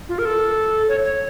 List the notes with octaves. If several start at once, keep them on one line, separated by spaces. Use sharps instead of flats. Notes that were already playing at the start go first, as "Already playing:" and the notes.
F4
A#4
A4
C#5
C#5